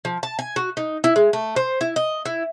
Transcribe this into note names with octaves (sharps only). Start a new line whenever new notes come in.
F3
A5
G#5
F#4
D#4
E4
G#3
A3
C5
E4
D#5
E4